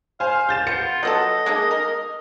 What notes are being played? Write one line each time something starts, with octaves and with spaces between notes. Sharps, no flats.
C5 F5 G#5
G6 A6 E7
B3 F4 C#7
F#3 B3 A4 D#5
G#3 A#3 D#4
A#4